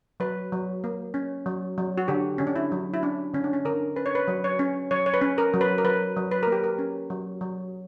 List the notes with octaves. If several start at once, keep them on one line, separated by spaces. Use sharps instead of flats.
F#3 B4
F#3
A#3
C#4
F#3
F#3
F#4
D3 G4
D3 C#4
D4
E4
F#3
E4
C#4 D4
D3 C#4
D4
C#4
D3 A#4
C#4 B4
C#5
B4
F#3
C#5
C#4
F#3 C#5
C#5
B4
C#4
A#4
F#3
B4
A#4
F#3 B4
F#3
B4
A#3 A#4
G4
A#4
C#4
F#3
F#3